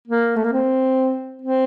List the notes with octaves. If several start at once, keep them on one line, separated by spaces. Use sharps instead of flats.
A#3
A3
A#3
C4
C4